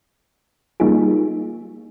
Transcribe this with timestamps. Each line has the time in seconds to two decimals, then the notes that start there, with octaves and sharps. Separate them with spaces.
0.80 G3 A#3 D#4 F4 G#4